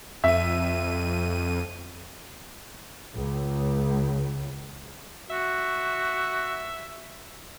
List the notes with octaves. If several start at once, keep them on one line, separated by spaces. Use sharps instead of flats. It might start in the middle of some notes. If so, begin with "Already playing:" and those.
F2 E5 D#7
C#2
F#4 E5